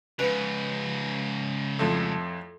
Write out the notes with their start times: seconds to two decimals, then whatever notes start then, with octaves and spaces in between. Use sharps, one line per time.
0.19 G#2 C#3 B4
1.79 F2 A2